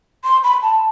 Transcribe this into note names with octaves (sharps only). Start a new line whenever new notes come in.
C6
B5
A5